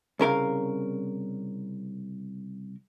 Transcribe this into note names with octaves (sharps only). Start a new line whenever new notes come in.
C2 C#3 A#4 F5